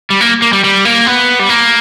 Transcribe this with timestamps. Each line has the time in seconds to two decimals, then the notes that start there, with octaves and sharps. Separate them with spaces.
0.10 G3
0.21 A#3
0.42 A#3
0.53 G3
0.64 G3
0.85 A#3
1.07 B3
1.39 G3
1.49 A#3